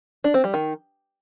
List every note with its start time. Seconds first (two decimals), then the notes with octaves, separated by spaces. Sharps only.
0.24 D4
0.34 C4
0.44 G3
0.54 D#3